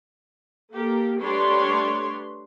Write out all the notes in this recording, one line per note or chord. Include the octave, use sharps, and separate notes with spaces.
A#3 G4 A4 A#4
G3 A3 D4 B4 C#5 C6